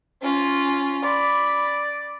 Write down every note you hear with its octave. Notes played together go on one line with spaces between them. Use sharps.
C#4 F4
D5 B5